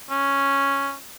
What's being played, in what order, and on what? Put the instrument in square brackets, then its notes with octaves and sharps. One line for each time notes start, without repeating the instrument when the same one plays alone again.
[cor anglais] C#4